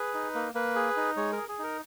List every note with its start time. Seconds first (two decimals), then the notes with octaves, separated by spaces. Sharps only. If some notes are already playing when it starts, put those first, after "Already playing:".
Already playing: G#4 B4
0.14 D#4
0.35 A#3
0.55 A#3 B4
0.75 G#4
0.97 D#4
1.17 G#3 C#5
1.32 A#4
1.37 G#4
1.49 G#4
1.59 D#4 A#4